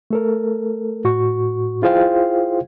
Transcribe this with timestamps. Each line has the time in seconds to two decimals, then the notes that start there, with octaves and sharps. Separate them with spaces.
0.10 A3 A4 A#4
1.04 A2 F#4 C#6
1.82 E4 F4 G#4 C5 F5 G5